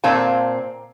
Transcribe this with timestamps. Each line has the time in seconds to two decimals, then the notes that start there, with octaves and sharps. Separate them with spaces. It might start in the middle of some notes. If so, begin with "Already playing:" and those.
0.04 A#2 C4 F5 A5